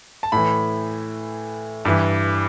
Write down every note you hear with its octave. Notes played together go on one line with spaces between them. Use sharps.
A5
A2 E3 B5
G2 E3